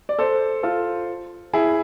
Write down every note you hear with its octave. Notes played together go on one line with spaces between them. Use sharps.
D5
A4 C5
F4 A4
E4 G#4